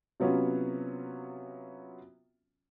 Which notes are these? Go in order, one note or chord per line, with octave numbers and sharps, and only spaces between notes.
C3 F#3 B3 C#4 F4